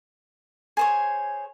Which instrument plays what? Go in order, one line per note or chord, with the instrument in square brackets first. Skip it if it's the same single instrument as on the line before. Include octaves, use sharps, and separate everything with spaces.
[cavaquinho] G#4 C5 C#5